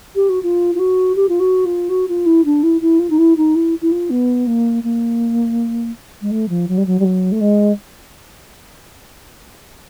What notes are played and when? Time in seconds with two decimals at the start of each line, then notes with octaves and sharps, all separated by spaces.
0.15 G4
0.29 F#4
0.43 F4
0.75 F4
0.79 F#4
1.15 G4
1.29 F4
1.40 F#4
1.65 F4
1.89 F#4
2.08 F4
2.26 E4
2.45 D4
2.63 E4
2.81 E4
2.99 F4
3.10 D#4
3.18 E4
3.37 D#4
3.55 E4
3.81 E4
3.92 F4
4.10 B3
4.47 A#3
4.83 A#3
6.21 G#3
6.31 A3
6.49 F3
6.68 F#3
6.77 G3
6.86 F#3
6.99 G3
7.04 F#3
7.32 A3
7.41 G#3